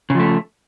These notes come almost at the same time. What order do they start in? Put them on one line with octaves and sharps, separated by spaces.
C#3 F3 A3